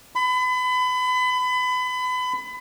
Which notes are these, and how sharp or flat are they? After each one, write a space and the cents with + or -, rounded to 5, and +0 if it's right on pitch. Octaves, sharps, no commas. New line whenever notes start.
B5 +30